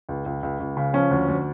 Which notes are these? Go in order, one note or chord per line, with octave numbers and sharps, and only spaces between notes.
C#2
C#2
C#2
C#2
C#3
F3 C#4
D2
D2